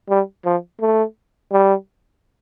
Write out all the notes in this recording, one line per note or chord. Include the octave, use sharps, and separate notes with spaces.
G3
F3
A3
G3